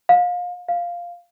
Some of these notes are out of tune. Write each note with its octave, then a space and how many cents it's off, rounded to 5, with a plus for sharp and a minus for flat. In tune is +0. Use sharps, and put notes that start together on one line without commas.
F5 +30
F5 +0